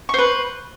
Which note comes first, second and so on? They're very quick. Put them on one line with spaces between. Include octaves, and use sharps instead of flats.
C#6 C5 B4